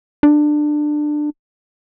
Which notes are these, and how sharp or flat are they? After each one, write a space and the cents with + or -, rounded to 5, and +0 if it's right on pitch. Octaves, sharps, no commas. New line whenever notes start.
D4 +20